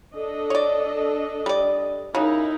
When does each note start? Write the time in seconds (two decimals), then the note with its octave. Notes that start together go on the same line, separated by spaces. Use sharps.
0.14 D4 A4 D#5
0.50 C#5 D5
1.46 G3 D5
2.15 C#3 F#3 D#4 E4 A#4